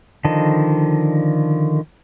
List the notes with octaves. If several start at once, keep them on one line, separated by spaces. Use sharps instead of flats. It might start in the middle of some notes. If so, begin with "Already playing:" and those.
D3 D#3 F3 D#5 A5